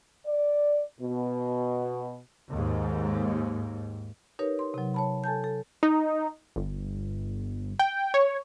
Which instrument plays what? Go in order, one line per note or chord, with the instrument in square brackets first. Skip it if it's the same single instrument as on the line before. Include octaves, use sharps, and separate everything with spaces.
[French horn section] D5
B2
[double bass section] D#2 G#2
[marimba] D#4 G4 A#4 B4 C#5
C6
C3 F#3
C#5 A5 B5
A4 G#5 A5 G6
A4
[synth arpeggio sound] D#4
G1
G5
C#5